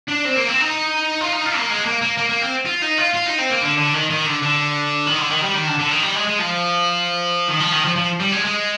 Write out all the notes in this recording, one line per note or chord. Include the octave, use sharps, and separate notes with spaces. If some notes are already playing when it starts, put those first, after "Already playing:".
D4
C4
A#3
C4
D#4
F4
D#4
F4
A#3
G#3
A#3
A#3
A#3
A#3
C4
F4
D#4
F4
F4
D#4
C4
A#3
D3
D3
D#3
D#3
D3
D3
D#3
D3
D#3
G3
D#3
D3
D3
D#3
G3
G#3
G#3
F3
D#3
F3
D#3
F3
F3
G3
G#3
G#3